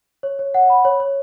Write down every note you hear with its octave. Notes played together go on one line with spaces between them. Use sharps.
C#5
C#5
F#5
B5
C#5
C#5